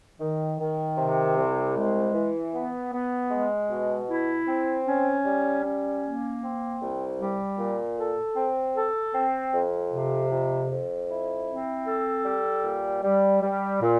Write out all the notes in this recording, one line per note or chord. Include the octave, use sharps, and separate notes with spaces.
D#3
D#3
C3
C2
G#3
E3
B3
B3
G#3
B2
E4
C4
C#4
G3
C#4
A#3
C4
C2
G3
A#2
A4
C4
A4
C4
F2
C3
F2
F2
E4
C4
A4
G3
A#2
G3
G3
A#2